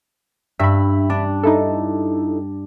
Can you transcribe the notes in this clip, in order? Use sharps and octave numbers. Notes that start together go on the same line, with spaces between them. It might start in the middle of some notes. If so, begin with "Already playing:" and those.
G2 E5 B5
D4
D#4 E4 A4